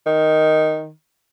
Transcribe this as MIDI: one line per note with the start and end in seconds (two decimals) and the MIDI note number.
0.06 0.90 51